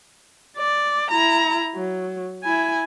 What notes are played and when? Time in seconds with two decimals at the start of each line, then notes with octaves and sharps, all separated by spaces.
0.58 D5
1.11 E4 A#5
1.75 F#3
2.44 E4 G#5